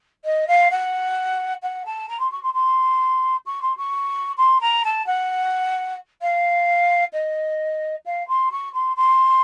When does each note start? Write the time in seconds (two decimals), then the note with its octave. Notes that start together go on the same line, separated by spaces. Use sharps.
0.24 D#5
0.48 F5
0.71 F#5
1.62 F#5
1.85 A5
2.09 A#5
2.19 C6
2.31 C#6
2.43 C6
2.53 C6
3.46 C#6
3.62 C6
3.77 C#6
4.37 C6
4.60 A#5
4.84 A5
5.06 F#5
6.21 F5
7.13 D#5
8.05 F5
8.28 C6
8.51 C#6
8.73 C6
8.96 C6